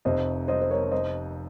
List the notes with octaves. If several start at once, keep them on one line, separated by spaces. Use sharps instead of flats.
F1 F2 C3 C5 D#5
C5 D#5
C5
A#4 C#5
C5 D#5